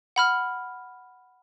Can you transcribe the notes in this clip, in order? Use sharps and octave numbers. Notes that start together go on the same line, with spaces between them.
F#5 B5 F6